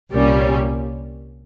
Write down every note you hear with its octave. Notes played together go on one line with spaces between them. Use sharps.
C2 A#2 G3 A#3 C#4